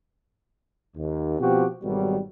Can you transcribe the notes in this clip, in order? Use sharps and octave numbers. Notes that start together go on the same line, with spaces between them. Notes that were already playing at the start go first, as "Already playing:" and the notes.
D#2
B2 F3 C4 F#4 G4
G#1 B2 D#3 F#3 G3